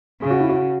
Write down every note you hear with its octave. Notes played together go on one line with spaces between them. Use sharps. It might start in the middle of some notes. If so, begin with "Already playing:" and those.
C#3 G#4
F#4
E4
F#4